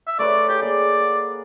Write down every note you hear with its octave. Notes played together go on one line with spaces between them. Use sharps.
E5
A3 B4 C#5 D5
G4 G#4
A#3 G#4 D5
F#5